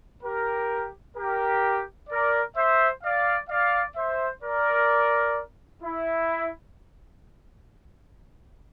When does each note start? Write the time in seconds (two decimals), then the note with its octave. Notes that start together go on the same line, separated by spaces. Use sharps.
0.23 G4 A#4
1.16 G4 A#4
2.09 A#4 D5
2.56 C5 E5
3.03 D5 F5
3.49 D5 F5
3.96 C5 E5
4.43 A#4 D5
5.82 E4